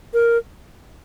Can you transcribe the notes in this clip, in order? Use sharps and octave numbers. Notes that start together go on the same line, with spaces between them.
A#4